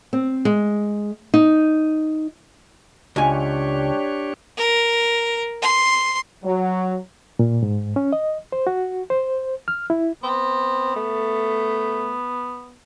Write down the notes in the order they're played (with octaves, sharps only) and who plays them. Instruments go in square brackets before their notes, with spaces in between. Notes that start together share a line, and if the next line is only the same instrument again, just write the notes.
[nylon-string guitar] C4
G#3
D#4
[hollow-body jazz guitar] C#2 G#5 [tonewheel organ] D4 G4 C#5
[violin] A#4
C6
[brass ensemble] F#3
[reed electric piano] A#2
G#2
C#4
D#5
C5
F#4
C5
F6
E4
[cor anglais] B3 [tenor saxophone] C4
[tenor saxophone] A3